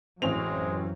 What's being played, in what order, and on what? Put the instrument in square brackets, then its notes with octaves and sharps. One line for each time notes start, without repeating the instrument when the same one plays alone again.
[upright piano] A1 F7 [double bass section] F#2 E3 F#3 [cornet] G#3 [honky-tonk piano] C4 C#4